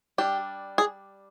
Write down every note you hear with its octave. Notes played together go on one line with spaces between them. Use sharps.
G3 D4 G4
G#4